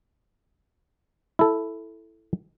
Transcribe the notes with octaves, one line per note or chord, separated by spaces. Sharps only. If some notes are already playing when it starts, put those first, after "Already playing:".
E4 A4